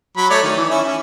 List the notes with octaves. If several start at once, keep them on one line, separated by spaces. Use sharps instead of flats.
F#3 B5
A3 C#5 D5
D#3
E3
C#4 E4
C#4